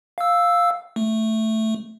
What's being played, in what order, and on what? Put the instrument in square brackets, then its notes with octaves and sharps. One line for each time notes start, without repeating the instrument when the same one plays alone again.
[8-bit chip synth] F5 E6
A3